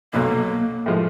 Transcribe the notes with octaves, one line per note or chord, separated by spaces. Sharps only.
B1 B2 F#3 A3 A#3
A2 F3 G#3